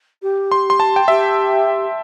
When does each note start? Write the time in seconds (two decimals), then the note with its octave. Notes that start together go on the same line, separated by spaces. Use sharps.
0.22 G4
0.52 C6
0.70 C6
0.80 A5
0.96 G5
1.08 G4 E5